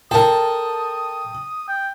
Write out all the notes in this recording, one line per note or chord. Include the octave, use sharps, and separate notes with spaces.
A4 A#4 G5 A5 D#6
G5